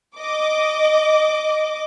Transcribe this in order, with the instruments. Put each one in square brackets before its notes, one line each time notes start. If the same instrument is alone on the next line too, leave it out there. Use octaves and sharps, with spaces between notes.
[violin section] D#5 D6